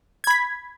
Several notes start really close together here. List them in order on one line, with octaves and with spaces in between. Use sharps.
G#6 B5 B6